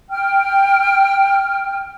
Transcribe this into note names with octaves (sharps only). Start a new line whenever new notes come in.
G5 F6